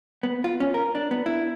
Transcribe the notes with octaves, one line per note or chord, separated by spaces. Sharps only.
B3
F4
C#4
A#4
D4
B3
E4